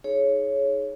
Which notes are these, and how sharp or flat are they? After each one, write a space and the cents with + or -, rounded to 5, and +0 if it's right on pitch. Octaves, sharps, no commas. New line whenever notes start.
D#4 +15 G#4 +20 C#5 +0